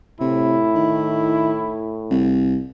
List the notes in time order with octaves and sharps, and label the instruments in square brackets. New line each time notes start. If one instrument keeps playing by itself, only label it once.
[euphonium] A2 [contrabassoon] C3 [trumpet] E4
[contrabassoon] D#3
C2